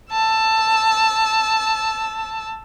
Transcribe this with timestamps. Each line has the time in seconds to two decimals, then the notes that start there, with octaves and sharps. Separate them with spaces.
0.11 A5 E6